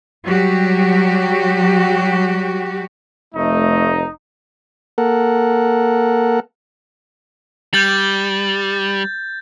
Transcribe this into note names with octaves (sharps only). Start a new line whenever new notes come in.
F#3 G3 F#4 G4
F1 A3 D#4
A#3 A4 A#4 F#5
G3 G6 A6